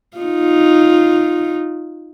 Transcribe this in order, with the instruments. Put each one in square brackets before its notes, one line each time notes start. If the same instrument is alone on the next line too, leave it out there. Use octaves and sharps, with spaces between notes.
[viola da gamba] D#4 F4